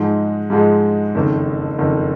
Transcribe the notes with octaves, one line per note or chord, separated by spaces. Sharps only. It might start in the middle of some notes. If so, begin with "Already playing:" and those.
Already playing: G#2 F3 G#3 D#4
G#2 F3 G#3 D#4
F#1 F2 D#3
F#1 F2 D#3